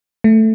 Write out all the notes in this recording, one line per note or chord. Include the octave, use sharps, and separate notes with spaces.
A3